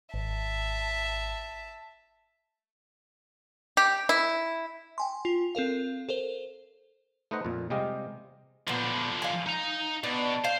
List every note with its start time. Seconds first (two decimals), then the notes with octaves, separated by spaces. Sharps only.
0.14 G#1 E5 A5
3.77 G4
4.09 E4
4.98 G5 G#5 C6
5.25 F4
5.55 C4 A4 A#4 F5
6.09 A4 A#4 C5
7.31 A3 D#4 B4 C5 D#5 F#5
7.45 F2 A#2
7.70 C3 G3 G#3 G4 D#5 F5
8.68 A#2 D3 F3 B3
9.22 F5 G#5
9.47 D#4 A#5
10.04 B2 D4
10.44 C5 F5